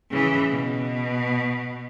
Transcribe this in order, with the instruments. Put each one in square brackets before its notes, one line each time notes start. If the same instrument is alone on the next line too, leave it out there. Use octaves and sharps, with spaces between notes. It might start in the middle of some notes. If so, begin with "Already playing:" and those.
[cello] C#3 E3
B2